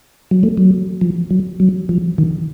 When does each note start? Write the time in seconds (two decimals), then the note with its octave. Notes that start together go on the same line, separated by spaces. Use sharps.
0.31 F#3
0.43 A3
0.57 F#3
1.01 F3
1.31 F#3
1.60 F#3
1.89 F3
2.18 D#3